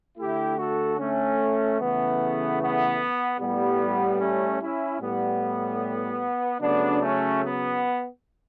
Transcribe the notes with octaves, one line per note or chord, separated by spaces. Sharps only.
D3 A3 E4 G4
F#4 A4
A3 C#4
C#3 E3 A3 B3
B3
A2 G3 B3
A3 C#4
C#4 E4
A2 G3 B3
C#3 F#3 A3 B3 D4
A3 C#4
B3